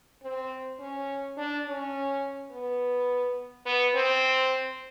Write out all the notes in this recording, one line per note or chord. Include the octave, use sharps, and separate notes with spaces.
C4
C#4
D4
C#4
B3
B3
C4